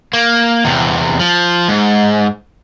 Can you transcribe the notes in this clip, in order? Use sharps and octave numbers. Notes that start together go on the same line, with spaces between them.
A#3
E2 C3
F3
G#2